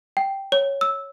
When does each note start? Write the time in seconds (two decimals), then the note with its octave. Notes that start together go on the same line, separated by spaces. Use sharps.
0.17 G5
0.52 C#5
0.81 E6